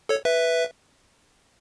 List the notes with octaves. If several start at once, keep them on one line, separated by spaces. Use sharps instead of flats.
A4 C#5
B4 E5